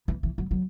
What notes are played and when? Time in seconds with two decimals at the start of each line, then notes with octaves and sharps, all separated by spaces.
0.08 E3
0.23 E3
0.38 F#3
0.51 F#3